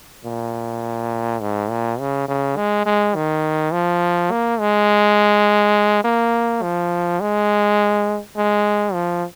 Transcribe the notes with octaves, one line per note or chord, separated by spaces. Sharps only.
A#2
G#2
A#2
C#3
C#3
G#3
G#3
D#3
F3
A#3
G#3
A#3
F3
G#3
G#3
F3